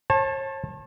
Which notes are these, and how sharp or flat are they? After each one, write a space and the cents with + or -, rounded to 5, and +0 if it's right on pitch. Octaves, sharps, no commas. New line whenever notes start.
C#5 -45 A5 +0